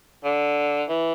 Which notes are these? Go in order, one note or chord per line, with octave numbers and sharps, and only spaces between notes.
D3
E3